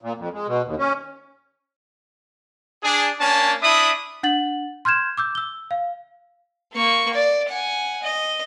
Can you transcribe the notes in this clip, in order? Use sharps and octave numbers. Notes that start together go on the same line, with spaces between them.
A#2
F2
G#3
B2
D#2
C#4
D4 G#4
A#3 C#4 D4 G#5 A5
D4 E4 E5 B5 D#6
D4 F#5 A6 F#7
C6 F6 G6 G#6 E7
D6 E6 G6
E6 G7
F5
A#3 C#6
D5
F#5 G#5
D#5